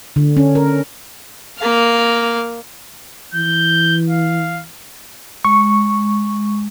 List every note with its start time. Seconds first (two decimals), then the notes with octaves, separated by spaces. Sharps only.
0.16 D3
0.37 C#4
0.55 A#4
1.58 A#3 F5
3.34 E3 G6
4.09 F5
5.45 G#3 C#6